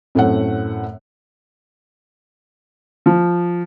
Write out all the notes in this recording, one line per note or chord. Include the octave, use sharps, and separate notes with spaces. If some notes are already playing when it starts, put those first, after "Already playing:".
F#2 A2 A3 C4 F#5
F3